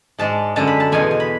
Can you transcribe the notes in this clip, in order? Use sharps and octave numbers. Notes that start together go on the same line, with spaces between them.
G#2 G#3 D4 A5
F#2 D3 G#3 A5
B5
A5
E2 B2 G#3 G#5
G#5
B5